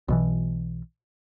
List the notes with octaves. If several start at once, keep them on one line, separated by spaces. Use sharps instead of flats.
B1 B2 E3